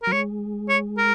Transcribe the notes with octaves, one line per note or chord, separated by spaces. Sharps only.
F#3 A#4
G#3 C#5
C#5
A#4